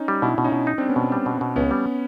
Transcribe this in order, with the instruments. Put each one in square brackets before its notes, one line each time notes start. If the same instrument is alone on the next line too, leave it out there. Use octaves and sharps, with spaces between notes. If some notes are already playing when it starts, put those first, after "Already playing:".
Already playing: [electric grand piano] C#4 D#4
[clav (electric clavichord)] G3
[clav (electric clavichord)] B2 [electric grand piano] D4 E4
[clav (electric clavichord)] B2
[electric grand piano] C#4 D#4
[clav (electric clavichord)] B2
D#4
[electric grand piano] C4 D4
[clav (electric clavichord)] G3
[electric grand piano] B3 C#4
[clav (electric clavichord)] B2
G3
B2
B2
[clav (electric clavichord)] C#2 [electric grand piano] B3 C#4
[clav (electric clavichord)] G3